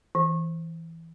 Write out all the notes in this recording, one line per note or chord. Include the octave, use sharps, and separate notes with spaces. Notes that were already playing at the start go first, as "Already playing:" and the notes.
E3